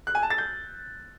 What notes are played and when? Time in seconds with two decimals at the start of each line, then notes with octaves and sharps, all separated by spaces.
0.07 F#6
0.15 G#5
0.23 A5
0.30 A6
0.38 G6